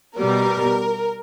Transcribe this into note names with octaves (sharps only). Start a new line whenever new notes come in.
B2 G3 B3 A#4